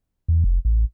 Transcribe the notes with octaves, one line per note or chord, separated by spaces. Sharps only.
E2
F1
A1